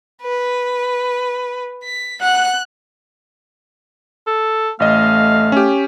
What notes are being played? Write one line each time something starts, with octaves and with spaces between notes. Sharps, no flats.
B4
B6
F#5 F#6
A4
A1 A3 D#5 F5
C#4 G4